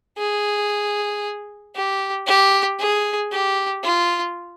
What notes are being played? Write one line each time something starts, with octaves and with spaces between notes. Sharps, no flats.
G#4
G4
G4
G#4
G4
F4